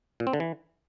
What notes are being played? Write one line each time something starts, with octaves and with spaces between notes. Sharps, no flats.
A#2
C4
D3
E3